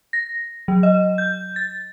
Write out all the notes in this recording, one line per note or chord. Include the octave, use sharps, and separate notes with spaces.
A#6
F#3
D#5
G6
A6